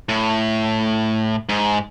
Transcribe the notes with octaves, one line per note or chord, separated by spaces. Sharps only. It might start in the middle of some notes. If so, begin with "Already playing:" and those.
A2
G#2